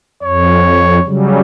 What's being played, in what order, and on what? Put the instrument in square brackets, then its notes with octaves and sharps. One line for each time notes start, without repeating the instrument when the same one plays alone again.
[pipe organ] F2 [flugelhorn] C#5
[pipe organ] C#3 F#3 G3